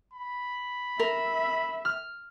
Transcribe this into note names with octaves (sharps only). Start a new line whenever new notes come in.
B5
A#4 E5
F6